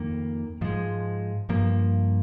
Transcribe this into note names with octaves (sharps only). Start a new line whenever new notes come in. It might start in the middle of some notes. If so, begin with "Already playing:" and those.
Already playing: F2 D#3 A#3
G#2 F3 G#3
G2 F3 A#3